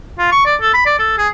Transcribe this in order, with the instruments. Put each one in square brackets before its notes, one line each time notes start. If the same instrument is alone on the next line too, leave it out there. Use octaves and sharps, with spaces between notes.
[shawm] F4
C#6
D5
A4
B5
D5
A4
G#4